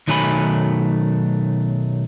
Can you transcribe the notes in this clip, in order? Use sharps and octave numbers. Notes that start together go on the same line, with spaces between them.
B1 D#3 F#3 A3 G#5 B5